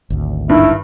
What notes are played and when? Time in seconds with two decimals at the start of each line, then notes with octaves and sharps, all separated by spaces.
0.10 G#1 D2
0.49 G2 D#3 E4